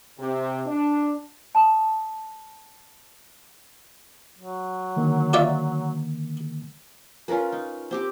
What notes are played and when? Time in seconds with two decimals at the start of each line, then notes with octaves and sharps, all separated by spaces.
0.19 C3
0.67 D4
1.55 A5 D#6
4.38 F#3
4.96 D3 D#3 A#3
5.33 F4 D5 E5
7.28 C#4 F4 A#4 B4
7.52 D#4
7.91 C4 G4 D6